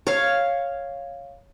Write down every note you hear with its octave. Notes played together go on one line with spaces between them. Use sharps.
C#5 F5